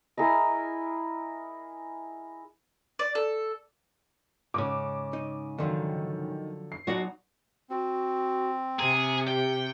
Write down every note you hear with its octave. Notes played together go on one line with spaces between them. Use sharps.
E4 G#4 A#4 D#5
D5
A4
G#2 C#3 D6
D#4
D3 D#3 F3 F#3
C7
F#3 D#4 F#4 D5 F#5
C4 F#4
C3 G#4 A#5
G4 G5